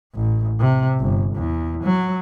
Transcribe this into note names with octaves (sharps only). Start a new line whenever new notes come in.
A1
C3
G1
E2
F#3